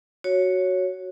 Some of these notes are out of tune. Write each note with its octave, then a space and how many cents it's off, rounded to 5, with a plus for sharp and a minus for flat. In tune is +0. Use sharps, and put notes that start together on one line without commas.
F#4 +0 C#5 +0